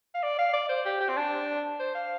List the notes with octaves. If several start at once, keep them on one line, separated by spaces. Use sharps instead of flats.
F5
D5
F5
D5
C5
G4
G4
C4
D4
C5
F5